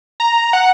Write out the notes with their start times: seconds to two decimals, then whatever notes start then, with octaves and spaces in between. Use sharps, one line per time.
0.20 A#5
0.53 F#5